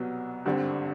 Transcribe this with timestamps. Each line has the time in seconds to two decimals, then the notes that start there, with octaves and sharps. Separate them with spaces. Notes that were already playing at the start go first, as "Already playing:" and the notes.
Already playing: C2 B2 F#3 B3
0.45 G#1 G2 D3 G3 C4